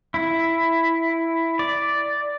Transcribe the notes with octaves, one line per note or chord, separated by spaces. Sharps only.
E4
D5